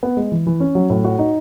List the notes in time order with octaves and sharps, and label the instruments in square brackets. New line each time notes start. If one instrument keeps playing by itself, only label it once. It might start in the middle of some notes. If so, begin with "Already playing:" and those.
[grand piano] B3
G#3
E3
E3
C#4
F#3
A2
F#4
D#4